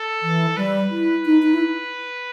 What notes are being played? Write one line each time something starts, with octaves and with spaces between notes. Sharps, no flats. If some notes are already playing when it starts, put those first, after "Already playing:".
Already playing: A4
E3
G3 B4
E4
D#4
D#4
E4